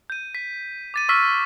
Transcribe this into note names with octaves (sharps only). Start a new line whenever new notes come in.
G6 D#7
B6
D6 A6 D#7
C#6 E6 F6 B6 D#7